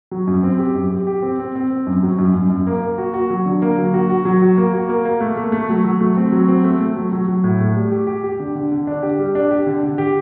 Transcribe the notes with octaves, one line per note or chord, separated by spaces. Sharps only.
F#3
F#2
C4
G4
F#2
G4
G4
C4
C4
C4
C4
F#2
F#3
F#2
F#2
F#2
A#3
A#3
F#4
F#4
F#3
D3
A#3
F#3
F#4
F#4
F#3
F#4
A#3
F#4
A#3
A#3
A3
A3
A3
F#3
F#3
A3
C4
F#3
C4
A3
A3
F#3
F#3
F#3
A2
A3
G3
G4
G4
G4
D3
D3
D3
D4
G4
G3
D4
G4
D3
D3
G4